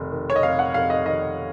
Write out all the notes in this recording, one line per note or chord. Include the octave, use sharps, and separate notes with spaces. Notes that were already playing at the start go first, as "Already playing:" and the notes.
Already playing: F1 D#3
D#3
C#5
D#5
F1 F5
F#5
F1 F5
D#5
D#3 D#5